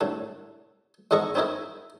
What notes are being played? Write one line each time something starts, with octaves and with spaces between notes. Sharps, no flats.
C2 A2 D4
E2 G#2 A4 D#5 A#5 C#6
C4 C#4 D#4 E4 A#4